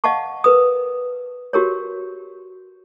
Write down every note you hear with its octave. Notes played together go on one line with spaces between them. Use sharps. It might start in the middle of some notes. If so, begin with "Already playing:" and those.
D#5 F5 F#5 A5 C#6
A#4 B4 D#6
F#4 G4 A#4 C#5